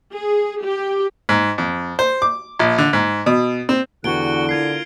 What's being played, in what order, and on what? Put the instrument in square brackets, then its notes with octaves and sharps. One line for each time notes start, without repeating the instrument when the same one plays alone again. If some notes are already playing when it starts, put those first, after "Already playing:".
[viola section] G#4
G4
[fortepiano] G#2
F2
C5
D6
A#1
D3
G#2
B2
C4
[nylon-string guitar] E2 [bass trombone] D3 [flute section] F#4 G4 F#6 [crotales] D7 G7
[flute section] F4 A#4 [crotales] G#6 C7